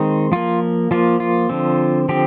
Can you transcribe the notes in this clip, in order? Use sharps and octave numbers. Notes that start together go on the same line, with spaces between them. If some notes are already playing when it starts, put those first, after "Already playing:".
Already playing: D#3 G#3 C4 D#4
F3 A#3 F4
F3 A#3 F4
F4
D3 F3 C4
D3 F3 C4 G4